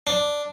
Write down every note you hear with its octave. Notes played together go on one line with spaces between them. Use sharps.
D4